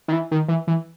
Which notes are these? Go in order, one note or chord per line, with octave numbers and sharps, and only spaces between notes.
D#3
E3
D#3
E3
E3